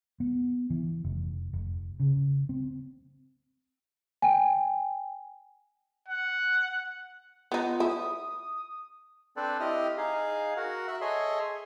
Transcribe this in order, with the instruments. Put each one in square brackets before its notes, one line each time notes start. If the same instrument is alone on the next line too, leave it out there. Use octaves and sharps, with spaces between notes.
[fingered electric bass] B3
E3
F1
F1
C#3
C4
[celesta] G5 G#5
[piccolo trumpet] F#5
[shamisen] B3 D#4 [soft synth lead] F4
[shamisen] E4 [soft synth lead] D#6
[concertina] C4 D4 A4 B4 C5 D5
C4 E4 G4 D#5 D#6 F6
D#4 G#4 F5
F#4 A#4 F#5
F#4 E5 F#6
G#4 A4 C#5 D#5 E5 C6